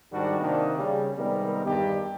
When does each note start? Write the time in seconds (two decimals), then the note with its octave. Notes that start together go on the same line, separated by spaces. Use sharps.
0.12 G#2 D#3 G3 D4 F#4
0.41 C3 D#3 A#3 C4 D4
0.77 C#3 G3
1.18 C3 D#3 G3 G#3 B3 A#4
1.65 E2 G2 D#3 G3 D#4 G4